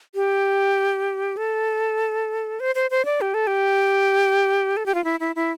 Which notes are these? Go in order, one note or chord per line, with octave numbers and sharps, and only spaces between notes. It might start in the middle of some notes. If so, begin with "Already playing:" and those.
G4
A4
C5
C5
C5
D5
G4
A4
G4
A4
G4
F4
E4
E4
E4